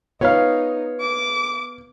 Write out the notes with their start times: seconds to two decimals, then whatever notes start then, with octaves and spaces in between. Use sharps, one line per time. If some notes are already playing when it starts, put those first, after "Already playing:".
0.21 B3 D#4 F4 B4 C#5 F5
1.00 D6